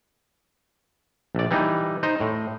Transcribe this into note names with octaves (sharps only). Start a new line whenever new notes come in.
A#1 D5
E3 G3 D#4
D#4 C5
A2